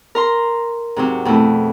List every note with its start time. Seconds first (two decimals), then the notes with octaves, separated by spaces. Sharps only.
0.15 A#4 A#5 C6
0.96 G#2 C3 F#3
1.25 F2 B2 A3 E4